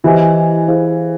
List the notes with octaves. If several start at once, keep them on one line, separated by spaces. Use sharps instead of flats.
E3 E4 G4 C5 D#5 G#5
E4 G#4 C5 F5